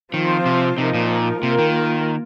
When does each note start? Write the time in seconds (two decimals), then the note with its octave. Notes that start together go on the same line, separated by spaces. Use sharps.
0.14 D#3 F3 C4 F4 C5
0.46 C3
0.78 C3 F3 D#4 A#4
0.94 A#2
1.43 C3 A#3 F4 A#4
1.59 D#3